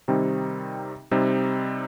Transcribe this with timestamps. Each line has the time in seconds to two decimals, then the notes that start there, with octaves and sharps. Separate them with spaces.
0.08 C3 D#3 G3 C4 D#4
1.11 C3 G3 C4 D#4